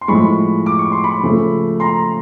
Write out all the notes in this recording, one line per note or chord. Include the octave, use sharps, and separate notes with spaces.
C6
A2 F3 G#3 B5 C#6
D6
C#6
C6
B5 C#6
C#3 F3 A3
A#5 C6